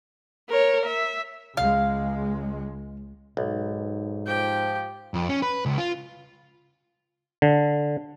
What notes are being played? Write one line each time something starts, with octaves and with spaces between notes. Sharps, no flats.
A#4 C#5
E5
C#2 G#3 F5
B1 G#2
F3 G4 G5
F2
C#4
B4
C#2
F4
D3